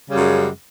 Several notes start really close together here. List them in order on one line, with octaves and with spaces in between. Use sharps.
C#3 G3 F#2 G#3